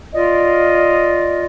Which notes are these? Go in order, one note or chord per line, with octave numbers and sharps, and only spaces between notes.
F4 D5 D#5